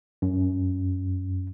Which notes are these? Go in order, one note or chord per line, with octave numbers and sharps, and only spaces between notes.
F#2